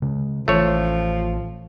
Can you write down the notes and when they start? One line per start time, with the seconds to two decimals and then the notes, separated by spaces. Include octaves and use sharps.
0.02 C#3 G#3
0.48 A1 E3 F3 A3 C#4 C#5